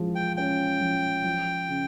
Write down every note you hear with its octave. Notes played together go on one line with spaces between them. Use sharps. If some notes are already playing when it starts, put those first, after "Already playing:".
Already playing: F3 G#3
G5
C#4 G5
F3
F3
C#3